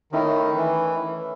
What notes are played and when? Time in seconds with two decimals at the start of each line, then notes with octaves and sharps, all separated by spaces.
0.12 D#3 A3 C#4 E4
0.56 E3